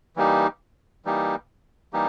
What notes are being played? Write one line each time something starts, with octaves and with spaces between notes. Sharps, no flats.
E3 G3 A#3 D#4 G4
E3 G3 A#3 D#4 G4
E3 G3 A#3 D#4 G4